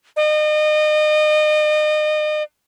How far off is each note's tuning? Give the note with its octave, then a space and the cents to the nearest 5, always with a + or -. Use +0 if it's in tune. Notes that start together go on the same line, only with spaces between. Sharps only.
D#5 -35